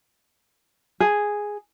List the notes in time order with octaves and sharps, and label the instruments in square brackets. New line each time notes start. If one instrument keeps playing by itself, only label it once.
[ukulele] G#4